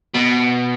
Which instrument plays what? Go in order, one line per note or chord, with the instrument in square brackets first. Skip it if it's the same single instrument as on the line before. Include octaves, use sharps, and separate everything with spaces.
[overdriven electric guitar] B2